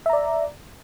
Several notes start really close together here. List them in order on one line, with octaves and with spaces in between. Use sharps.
E5 A#5 D5